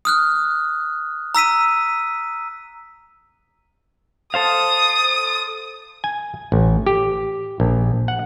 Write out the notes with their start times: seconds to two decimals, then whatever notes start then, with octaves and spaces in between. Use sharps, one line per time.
0.05 D#6 F6 F#6
1.35 A#5 E6 B6 D#7
4.34 A4 C5 F5 D#6
6.04 G#5
6.52 A1
6.87 G4
7.60 A#1
8.08 F#5